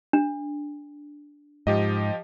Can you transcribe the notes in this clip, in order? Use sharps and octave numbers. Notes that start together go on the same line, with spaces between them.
D4
G#2 F3 G4 D#5